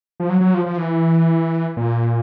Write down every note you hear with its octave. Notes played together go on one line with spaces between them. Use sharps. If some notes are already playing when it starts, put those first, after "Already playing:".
F3
F#3
F#3
F3
F3
E3
A#2